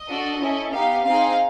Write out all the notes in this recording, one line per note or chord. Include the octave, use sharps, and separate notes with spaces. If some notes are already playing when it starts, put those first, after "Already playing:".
Already playing: D#5
D4 F#4 A4
C#4 E4 A4
B3 D#4 G4 F5
C4 D#4 G#4 F5